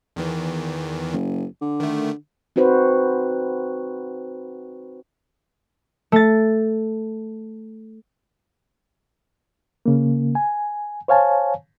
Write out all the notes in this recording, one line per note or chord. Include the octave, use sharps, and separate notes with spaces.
E2 D#3 E3
F#1
D3
D#3 A3
C4 D#4 F#4 B4 C5
A3 A6
C#3 A#3
G#5
C5 C#5 F5 G#5 A5